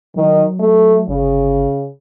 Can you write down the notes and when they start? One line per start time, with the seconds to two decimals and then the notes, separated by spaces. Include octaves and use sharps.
0.16 D#3 F#3
0.60 A3
1.08 G1 C#3